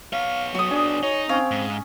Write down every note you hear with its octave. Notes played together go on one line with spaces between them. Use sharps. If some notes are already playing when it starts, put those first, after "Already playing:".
B3 C#5 F5
F#3 F#4 D#6
D4 G#4
D#4 C#5
C4 C#4 F5
G#2